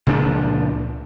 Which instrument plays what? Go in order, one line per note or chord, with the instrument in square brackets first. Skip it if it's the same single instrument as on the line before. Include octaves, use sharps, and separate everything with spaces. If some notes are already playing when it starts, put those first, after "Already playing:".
[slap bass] C#2 A#2 F3 D4